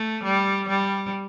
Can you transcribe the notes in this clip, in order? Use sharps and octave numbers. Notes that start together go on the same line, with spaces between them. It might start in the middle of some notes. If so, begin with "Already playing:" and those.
Already playing: A3
G3
G3